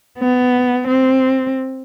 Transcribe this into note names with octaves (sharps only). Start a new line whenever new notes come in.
B3
C4